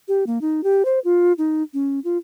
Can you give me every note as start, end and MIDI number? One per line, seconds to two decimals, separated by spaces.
0.08 0.26 67
0.27 0.39 58
0.42 0.63 63
0.64 0.85 67
0.85 0.99 72
1.05 1.33 65
1.38 1.63 63
1.74 2.00 61
2.04 2.18 65